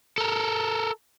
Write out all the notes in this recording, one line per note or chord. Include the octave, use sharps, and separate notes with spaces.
A4 A#4